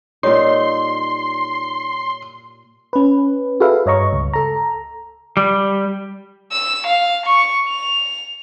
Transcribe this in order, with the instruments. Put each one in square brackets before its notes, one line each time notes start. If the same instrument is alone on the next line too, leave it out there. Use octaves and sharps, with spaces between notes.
[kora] A#2 G3 D#4 [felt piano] C#5 [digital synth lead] C6
[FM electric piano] C#4 B4
F#4 G#4 A4 B4 E5 F5
G2 C#5 D#5 A#5 C#6
C#2
A4 A#5
[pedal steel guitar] G3
[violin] E6
F5
C#6
F7